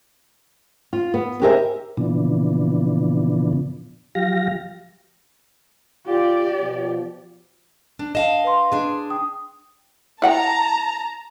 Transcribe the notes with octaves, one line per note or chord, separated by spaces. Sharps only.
F4
B3
G4 G#4 A#4 C5 E5
A#2 C#3 E3 F3 B3 D4
F3 F#3 G4 F5 A#6
F4 G4 D5
B2 F3
D4
D#5 F5 A5 E7
B4 C6
D4 G#4
G5 D#6
E4 F#5 G5 A5 A#5